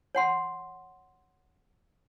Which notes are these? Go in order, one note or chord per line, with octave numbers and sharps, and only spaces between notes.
C#5 F#5 C6